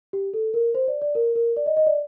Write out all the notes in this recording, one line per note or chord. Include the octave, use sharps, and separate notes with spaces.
G4
A4
A#4
C5
D5
D5
A#4
A#4
D5
D#5
D#5
D5